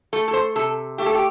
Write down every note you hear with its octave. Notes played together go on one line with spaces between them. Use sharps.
A3 A4
A4
C5
C3 A4
A3 G4
A4
G4